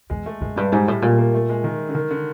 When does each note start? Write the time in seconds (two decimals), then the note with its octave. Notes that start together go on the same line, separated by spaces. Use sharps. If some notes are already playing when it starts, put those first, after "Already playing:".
0.10 E2 G#3
0.26 A3
0.41 F#2 G#3
0.56 G2 G3
0.72 G#2 G3
0.88 A2 G#3
1.02 A#2 A3
1.18 A#3
1.34 A3
1.49 G#3
1.64 D#3
1.89 D3
1.95 D#3
2.10 D3